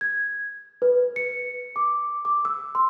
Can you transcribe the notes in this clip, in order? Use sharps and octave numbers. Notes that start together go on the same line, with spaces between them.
G#6
B4
C#7
D6
D6
E6
C6